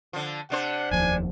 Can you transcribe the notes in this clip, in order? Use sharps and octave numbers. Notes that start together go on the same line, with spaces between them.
D3 F3
C3 D4 C5 F#5
F1 D#2 F3 G#5